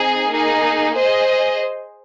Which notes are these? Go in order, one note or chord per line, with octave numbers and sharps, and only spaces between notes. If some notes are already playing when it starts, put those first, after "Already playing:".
Already playing: C4 D#4 G#4
A#3 D#4 G#4
G#4 C5 D#5